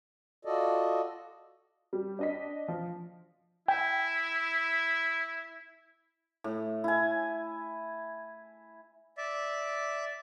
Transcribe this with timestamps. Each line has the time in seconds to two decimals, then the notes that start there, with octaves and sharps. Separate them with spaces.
0.45 F4 F#4 A4 D5 D#5
1.93 G3
2.19 D4 D#5 B6
2.68 F3
3.68 E4 G5 G#5
6.44 A2
6.84 E4 G#5
9.17 D5 E5